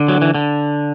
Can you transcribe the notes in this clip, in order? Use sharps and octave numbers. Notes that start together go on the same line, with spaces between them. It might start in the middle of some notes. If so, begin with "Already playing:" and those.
Already playing: D3
F#3
E3
D3